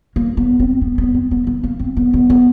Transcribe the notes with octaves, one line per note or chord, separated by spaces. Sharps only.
A#3
B3
C4
B3
B3
C4
B3
B3
A#3
C4
B3
B3
B3